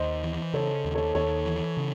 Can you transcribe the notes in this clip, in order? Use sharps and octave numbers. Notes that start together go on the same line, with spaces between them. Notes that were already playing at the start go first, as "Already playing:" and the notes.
Already playing: D#2 C5 D#5
E3
C#3 A4 C#5
D#2
A4 C#5
D#2 A4 C#5
E3
C#3